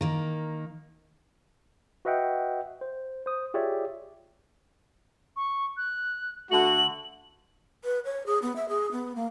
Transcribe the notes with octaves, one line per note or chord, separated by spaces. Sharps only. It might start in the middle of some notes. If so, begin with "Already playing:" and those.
D#3 A#3
F#4 B4 D#5 E5 F#5 G5
C5
C5 D#6
F4 G4 G#4 C#5 D5 E5
C#6
F#6
D3 A3 F#4 F#7
B4
C#5
G#4
B3
E5
G#4
B3
A#3